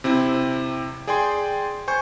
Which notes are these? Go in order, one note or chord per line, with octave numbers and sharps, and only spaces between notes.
C3 C4 E4
G#4 D5 G5 G#5 C6
C5 G#5 C#6 G6